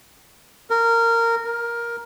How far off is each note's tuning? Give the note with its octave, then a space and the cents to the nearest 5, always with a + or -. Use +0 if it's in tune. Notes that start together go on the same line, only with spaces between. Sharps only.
A#4 -15
A#4 +10